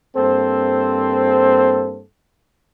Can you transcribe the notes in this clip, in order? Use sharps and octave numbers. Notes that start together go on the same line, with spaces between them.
G2 A#3 C4 A4 C5